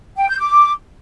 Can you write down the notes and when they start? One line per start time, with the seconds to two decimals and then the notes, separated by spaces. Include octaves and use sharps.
0.17 G5
0.28 G6
0.40 D6